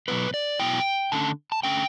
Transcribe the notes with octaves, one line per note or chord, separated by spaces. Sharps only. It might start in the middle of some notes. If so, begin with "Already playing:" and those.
B2 F#3 B3 E4 B4
D5
B2 F#3 B3 E4 G5
D3 A3 C#4 A5
A5
D3 A3 C#4 G5